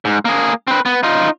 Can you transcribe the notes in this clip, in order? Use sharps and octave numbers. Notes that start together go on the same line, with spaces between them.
G#2
A#3 G#4
C4 B4
B3
D#4 F4